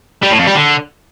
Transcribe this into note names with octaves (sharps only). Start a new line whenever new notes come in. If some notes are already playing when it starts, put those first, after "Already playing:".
G3
A2
F2
G3
D3